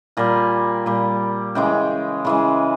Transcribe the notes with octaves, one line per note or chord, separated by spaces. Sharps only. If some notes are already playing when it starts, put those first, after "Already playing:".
A#2 G3 G#5
A#2 G3
C#3 E3 G#3 G5
C#3 E3 G#3